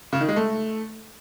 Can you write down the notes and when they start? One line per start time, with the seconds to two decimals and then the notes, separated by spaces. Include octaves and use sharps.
0.13 C#3
0.21 D#3
0.28 G#3
0.36 A3